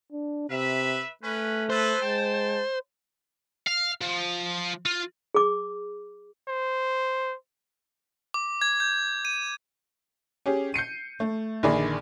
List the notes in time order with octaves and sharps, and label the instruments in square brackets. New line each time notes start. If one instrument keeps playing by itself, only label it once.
[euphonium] D4
[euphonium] C3 [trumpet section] B4 E5
[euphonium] A3 [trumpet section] C#4 B4
[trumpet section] A4 B4 [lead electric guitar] C5
[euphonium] G#3 [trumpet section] G5 A5
[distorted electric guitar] F5
F3
F4
[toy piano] G#4 D6
[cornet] C5
[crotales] D6
G#6
G6
D#7
[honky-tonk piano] C#4 G4 G#4
G6 C7 C#7 D#7
A3
A#1 D3 D#3 G#4 D5 B5